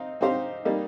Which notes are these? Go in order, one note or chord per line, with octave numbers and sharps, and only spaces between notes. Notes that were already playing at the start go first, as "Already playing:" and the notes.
Already playing: C4 D#4 F5
C4 D#4 G4 C5 F5
G3 A#3 D#4